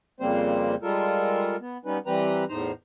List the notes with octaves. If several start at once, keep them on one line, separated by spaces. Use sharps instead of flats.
F2 C#3 G3 A#3 C4 C5
G3 G#3 F4 A4 A#4
B3
G3 B3 C#4 D#4 B4
E3 G3 C4 G4 B4 A#5
E2 A2 D#4 C5 A#5